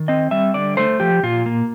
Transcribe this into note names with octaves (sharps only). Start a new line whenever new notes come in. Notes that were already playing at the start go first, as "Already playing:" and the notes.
Already playing: D#3
C4 D#5
G3 E5
D3 D5
A3 C5
F3 G4
A#2 F4
A#3